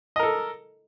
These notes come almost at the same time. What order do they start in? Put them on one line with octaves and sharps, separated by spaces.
D#5 A#4 A4